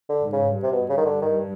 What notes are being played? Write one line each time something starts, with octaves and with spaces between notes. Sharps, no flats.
D3
G#2
C#3
G2
C3
B2
C#3
D#3
D3
D#3